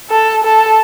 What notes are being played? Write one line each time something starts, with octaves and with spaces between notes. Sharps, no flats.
A4
A4